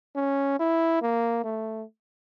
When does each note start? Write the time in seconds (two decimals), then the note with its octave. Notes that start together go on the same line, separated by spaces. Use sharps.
0.15 C#4
0.59 E4
1.01 A#3
1.44 A3